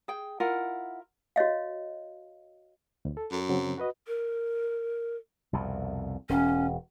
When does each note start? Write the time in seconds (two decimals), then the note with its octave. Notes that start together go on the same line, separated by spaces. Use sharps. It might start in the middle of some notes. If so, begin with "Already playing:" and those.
0.08 G#4 G5
0.40 E4 F4 A#4 F#5
1.36 F#4 C#5 D#5 F5
3.05 D2
3.17 A4
3.31 F#2
3.49 C#3 F#3 C4
3.78 F#4 B4 D#5
4.07 A#4
5.53 C2 F2 B2
6.29 E1 C#4